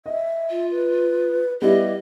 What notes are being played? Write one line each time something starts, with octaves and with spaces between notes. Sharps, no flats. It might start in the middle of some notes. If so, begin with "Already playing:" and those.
D#5 E5
F4
B4
G3 B3 E4 G4 D#5